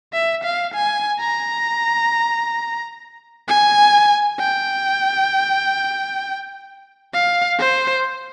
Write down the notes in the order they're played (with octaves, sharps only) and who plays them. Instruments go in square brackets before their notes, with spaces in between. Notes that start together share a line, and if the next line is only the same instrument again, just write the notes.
[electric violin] E5
F5
G#5
A#5
G#5
G5
F5
C5